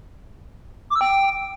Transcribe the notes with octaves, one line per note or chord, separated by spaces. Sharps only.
D6
E6
G5